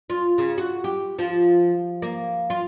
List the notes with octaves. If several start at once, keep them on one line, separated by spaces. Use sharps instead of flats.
F4
C#3
F#4
G4
F3
A#3
F4